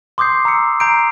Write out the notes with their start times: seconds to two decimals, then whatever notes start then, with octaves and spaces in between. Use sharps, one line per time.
0.18 C6 D6 D#6 G6 C7
0.45 A#5 E6 C#7
0.80 A#5 G6 C7 D7